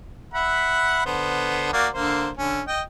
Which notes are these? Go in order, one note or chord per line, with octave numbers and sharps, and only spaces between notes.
E5 F#5 B5
D3 B3 C5
A#3 F#4 D5
D3 A#3 C5
D3 C#4
D#5 G5